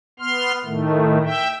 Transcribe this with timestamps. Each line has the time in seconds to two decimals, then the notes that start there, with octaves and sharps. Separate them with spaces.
0.19 B3 C6 F6
0.65 A2 D#3 A3
1.23 E5 G5